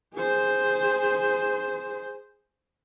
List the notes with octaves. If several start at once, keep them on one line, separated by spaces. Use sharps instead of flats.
G#4 C5